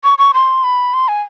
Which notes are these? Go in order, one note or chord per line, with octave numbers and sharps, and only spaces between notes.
C#6
C#6
C6
B5
C6
G#5